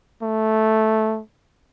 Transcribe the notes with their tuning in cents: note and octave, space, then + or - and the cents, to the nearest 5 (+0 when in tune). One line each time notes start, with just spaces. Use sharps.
A3 -5